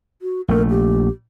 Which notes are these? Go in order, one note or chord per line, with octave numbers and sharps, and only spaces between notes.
F#4
A#1 A3 A#4
G4